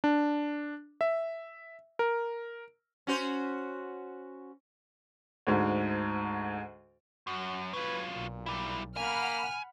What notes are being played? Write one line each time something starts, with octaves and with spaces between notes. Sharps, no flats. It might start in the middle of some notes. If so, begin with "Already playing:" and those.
D4
E5
A#4
C#4 F#4 C5
D2 G#2
F#2 F#4
F#3 F4 B4 G#6
B1 A#2
G3 E4
A#3 F#5 G#5 B5 F6